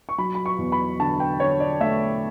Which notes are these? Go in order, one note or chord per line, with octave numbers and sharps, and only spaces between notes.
C#6
F#3 B5
B5
C#6
E2
B5
D3 A5
G5
D3 C#5
D5
A3 E5